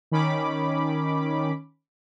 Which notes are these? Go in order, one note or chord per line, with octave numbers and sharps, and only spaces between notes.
D#3 C#4 B5 D6